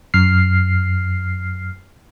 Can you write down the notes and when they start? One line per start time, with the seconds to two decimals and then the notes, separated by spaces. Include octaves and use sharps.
0.14 F#2 F6 C7